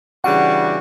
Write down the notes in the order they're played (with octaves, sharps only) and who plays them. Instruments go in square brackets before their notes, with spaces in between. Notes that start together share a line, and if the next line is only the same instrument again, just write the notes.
[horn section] C#3 E3 G3 D4 F#4 [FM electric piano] F#5